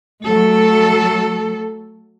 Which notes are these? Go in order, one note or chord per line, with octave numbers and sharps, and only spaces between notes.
F#3 A3 A4